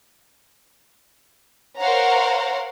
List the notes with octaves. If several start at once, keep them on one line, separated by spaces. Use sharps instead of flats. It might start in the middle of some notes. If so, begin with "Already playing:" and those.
A#4 C5 C#5 F5 F#5 A#5